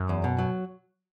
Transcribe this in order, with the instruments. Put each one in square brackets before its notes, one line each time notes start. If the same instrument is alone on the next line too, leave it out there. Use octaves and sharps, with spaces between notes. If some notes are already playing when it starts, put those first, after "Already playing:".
Already playing: [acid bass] F#2
[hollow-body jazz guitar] E2
B2
F#3